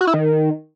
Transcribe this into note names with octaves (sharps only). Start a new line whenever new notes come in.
F#4
E4
D#3